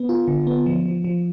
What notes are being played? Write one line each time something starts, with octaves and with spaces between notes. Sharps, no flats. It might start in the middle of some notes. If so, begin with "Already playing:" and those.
Already playing: B3
F4
D3
B3
F3
F3
F3